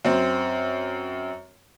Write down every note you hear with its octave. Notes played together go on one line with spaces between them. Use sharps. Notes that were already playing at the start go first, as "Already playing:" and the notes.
F#2 C4